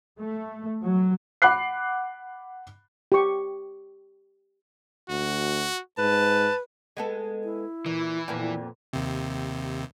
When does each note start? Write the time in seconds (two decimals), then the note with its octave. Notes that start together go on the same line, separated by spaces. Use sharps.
0.19 A3
0.82 F#3
1.42 F#5 B5 D6 F#6 C7
3.12 G4 C#6
5.09 D2 F#4
5.98 G#2 B4 A5
6.97 G#3 B3 A4
7.44 E4
7.86 A#2 E3
8.28 F2 A#2 B3
8.93 D#2 C3